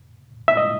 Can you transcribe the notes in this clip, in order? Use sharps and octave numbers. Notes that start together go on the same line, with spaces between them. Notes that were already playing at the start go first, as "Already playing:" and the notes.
E5
D#5